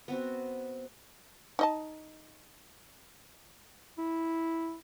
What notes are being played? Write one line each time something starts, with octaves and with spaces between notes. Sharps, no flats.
B3 C4 F#4
D#4 D#5 A5
E4